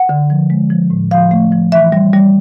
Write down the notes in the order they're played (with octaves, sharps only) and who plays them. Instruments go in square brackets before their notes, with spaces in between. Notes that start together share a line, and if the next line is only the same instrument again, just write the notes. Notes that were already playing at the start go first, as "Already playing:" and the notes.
Already playing: [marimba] F#5
D3
F3
G#3
F3
A2
F3 F5
A3
F3
E3 E5
G3
G3